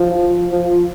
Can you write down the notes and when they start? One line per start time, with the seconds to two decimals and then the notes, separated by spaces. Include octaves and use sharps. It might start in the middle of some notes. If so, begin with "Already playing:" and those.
Already playing: F3
0.52 F3